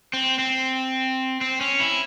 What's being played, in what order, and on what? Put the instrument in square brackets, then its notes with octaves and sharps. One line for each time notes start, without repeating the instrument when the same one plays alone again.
[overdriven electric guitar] C4
C4
C4
C#4
E4